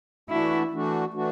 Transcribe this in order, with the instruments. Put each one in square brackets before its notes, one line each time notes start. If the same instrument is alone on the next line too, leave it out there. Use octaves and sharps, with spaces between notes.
[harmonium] E3 A3 D4 F#4 [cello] E4
[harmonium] E3 A3 D4 F#4
E3 A3 D4 F#4